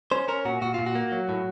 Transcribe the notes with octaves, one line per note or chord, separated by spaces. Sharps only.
C#4 C5
C#4 A#4
A#2 F#4
A#2 F#4
A#2 F4
F#4
A#3
F#3
A2